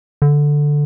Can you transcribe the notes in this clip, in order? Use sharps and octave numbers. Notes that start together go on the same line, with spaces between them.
D3